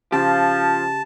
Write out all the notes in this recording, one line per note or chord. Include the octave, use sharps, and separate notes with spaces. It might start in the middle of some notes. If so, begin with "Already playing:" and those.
C#3 F3 G4 A5